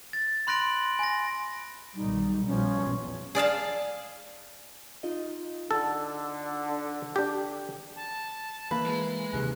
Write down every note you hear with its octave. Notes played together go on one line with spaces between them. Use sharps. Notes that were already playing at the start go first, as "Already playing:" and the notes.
A6
B5 C6 F#6 A#6 D7 F#7
G#5 A#6
B1 D#3 G3 D#4
B2 F3 G3 C#4
A#1 E2
G#4 D5 F5 A5
D#4 F4 D#5
D3 A4
D4 G4
A5
E3 A#3 B4
G#3
D#2 C3 E3 F#6